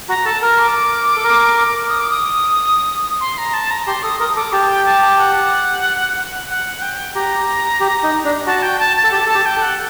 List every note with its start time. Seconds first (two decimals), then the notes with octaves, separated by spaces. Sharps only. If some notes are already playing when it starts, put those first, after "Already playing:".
0.09 F#4 A#5
0.26 A4 A5
0.42 A#4 A#5
0.58 D6
1.17 A4
1.24 A#4
1.89 D#6
2.00 D6
2.11 D#6
3.20 C6
3.38 A#5
3.53 A5
3.71 A#5
3.87 G4 C6
4.03 A4 D#6
4.20 A#4 D#6
4.36 A4 D6
4.53 G4 A5
4.69 G5
4.86 A5
5.01 A5
5.18 F#5
6.50 F#5
6.82 G5
7.15 G4 A#5
7.80 G4
8.04 D#4
8.25 D4
8.46 F#4 A5
8.63 G5
8.80 A5
8.96 A5
9.04 A4
9.12 G4 A5
9.26 A4 A5
9.34 G4
9.46 G5
9.57 A4
9.62 F#5